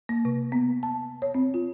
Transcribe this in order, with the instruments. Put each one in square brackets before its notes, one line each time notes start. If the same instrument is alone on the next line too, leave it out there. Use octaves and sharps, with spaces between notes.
[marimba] A#3
C3
B3
A5
C#5
C4
F4